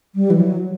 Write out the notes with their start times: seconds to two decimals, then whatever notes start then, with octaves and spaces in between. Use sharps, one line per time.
0.15 G3
0.30 E3
0.39 F#3